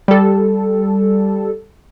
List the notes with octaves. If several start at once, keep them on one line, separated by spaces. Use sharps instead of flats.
G3 A4